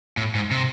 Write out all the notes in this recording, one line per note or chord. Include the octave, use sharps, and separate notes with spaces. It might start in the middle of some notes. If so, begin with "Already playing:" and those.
A2
G#2
C3